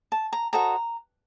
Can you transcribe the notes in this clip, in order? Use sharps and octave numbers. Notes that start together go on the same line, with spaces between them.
A5
A#5
F#4 A4 C5 D#5 A#5